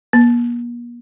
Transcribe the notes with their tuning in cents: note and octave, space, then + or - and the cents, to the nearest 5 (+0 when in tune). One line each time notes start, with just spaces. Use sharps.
A#3 +45